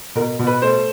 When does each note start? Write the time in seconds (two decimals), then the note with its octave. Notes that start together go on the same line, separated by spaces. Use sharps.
0.15 B2 A#4
0.39 B2
0.47 B4
0.62 A3 C5